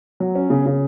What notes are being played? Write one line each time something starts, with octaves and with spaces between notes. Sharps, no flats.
F#3
C#4
C#3
C#3